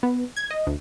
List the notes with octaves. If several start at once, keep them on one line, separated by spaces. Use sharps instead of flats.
B3
G#6
D#5
D2